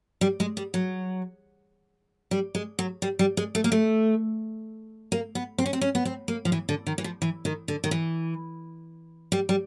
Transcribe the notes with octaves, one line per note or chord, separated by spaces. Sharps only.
G3
G#3
G3
F#3
G3
G#3
F#3
G3
G3
G#3
A3
A#3
A3
A#3
B3
C4
C#4
C4
C#4
B3
C4
A#3
F3
E3
D3
D#3
E3
F3
E3
D#3
D3
D#3
E3
G3
G3